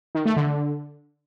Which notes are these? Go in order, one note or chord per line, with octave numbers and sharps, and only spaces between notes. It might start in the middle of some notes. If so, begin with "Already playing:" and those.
D#3
A3
D3